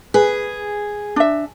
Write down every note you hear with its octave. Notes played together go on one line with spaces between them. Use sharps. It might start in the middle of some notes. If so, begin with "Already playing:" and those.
G#4 B4
D4 E5